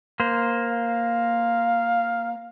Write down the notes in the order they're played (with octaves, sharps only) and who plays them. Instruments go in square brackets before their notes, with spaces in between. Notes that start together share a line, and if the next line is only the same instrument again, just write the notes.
[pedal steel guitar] A#3 C5
[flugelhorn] F5